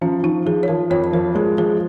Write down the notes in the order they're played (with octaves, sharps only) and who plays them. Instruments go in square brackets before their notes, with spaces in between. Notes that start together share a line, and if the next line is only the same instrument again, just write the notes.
[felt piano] F3 [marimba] C#4
[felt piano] F3 [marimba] D#4
[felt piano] F3 [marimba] G#4
[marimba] C#5
[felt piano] F3 [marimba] A#4
[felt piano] F2 [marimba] C#5
[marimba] C#5
[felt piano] F3 [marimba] A#4
[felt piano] G#3 [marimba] G#4
[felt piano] F3 [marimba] G#4